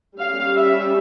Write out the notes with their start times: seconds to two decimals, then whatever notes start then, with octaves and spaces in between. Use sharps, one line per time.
0.17 G3 C#4 F5
0.56 E5